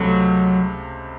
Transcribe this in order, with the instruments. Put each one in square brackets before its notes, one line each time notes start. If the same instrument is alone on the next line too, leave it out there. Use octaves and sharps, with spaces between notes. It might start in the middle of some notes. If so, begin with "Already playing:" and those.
Already playing: [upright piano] C#2 C3 A3 [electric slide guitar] F#3